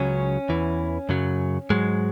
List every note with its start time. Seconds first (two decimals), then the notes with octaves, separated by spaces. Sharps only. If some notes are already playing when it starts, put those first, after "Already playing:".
Already playing: C#2 C#3 F#3 C#4
0.49 E2 E3
1.09 F#2 C#3 F#3
1.70 G#2 F#3 G#3